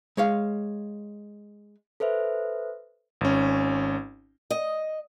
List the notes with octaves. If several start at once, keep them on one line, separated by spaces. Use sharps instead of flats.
G#3 C#5 F5
A4 B4 C5 E5
G#1 C#4
D#5